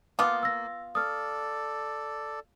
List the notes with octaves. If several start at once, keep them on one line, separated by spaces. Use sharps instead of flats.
A#3 B3 F4 D6 D#6
E6 A#6
A4 D5 D#6 F6